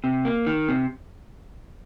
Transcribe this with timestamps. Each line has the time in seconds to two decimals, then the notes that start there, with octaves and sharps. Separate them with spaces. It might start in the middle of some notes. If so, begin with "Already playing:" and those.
0.04 C3
0.25 A#3
0.46 D#3
0.68 C3